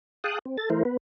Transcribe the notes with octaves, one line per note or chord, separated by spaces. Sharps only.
G#4 F5 G5 A5 D#6 F#6
C4
A4 A6
E3 A3 E4 A#4 C5
B3 B4